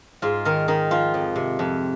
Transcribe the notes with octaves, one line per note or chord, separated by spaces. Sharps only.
G#2 F4
D#3 A#4
D#3 D#4
F3 F4
F2
C3
F2